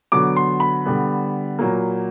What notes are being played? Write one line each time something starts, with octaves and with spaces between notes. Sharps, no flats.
D3 F#3 B3 D6
C6
B5
D3 G3 B3
A#2 F#3 A#3